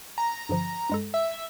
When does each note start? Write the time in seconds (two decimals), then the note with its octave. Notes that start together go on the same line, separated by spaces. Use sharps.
0.18 G#5 A#5
0.49 G2 D3 F3
0.89 G2 G#3 A4
1.14 E5